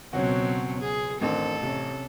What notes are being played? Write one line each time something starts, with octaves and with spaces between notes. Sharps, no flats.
C#2 B2 F#3 C4 C#4 F#4
G#4
A1 D#3 C4 D4 A4
C3 C#4